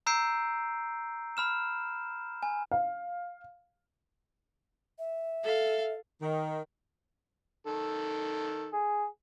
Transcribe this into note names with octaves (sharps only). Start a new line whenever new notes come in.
A#5 E6 G6 C7 D7
B5 F6 E7
G#5
F5
E5
A4 F5
D#3
D#3 A4
G#4